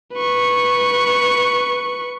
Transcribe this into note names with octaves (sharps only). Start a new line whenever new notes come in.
B4 C#6